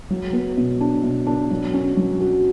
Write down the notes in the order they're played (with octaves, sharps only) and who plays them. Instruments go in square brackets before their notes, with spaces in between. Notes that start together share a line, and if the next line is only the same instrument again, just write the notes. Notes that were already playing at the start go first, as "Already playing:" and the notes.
[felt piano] F#3
B3
B2
D4
B2
D4
F#3
C#4
F#3
F#4